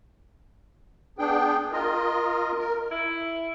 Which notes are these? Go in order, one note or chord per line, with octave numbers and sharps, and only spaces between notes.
B3 D4 G#4 G5
F4 A#4 D#5
A#4
E4